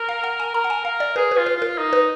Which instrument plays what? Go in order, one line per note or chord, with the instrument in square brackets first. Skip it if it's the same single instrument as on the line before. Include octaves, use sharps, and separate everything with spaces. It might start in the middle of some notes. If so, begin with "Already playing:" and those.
Already playing: [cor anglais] A#4
[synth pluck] F5
F#5
G#5
[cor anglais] A#4 [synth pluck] A#5
[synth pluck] F#5
G#5
[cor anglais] A#4 [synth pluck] F5
[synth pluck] D5
[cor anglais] G#4 [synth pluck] B4
[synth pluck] B4
[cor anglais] F4
[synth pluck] B4
[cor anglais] F4 [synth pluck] A#4
[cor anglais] D#4
[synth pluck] B4